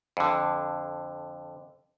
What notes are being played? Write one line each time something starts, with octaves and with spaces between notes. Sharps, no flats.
F2 D3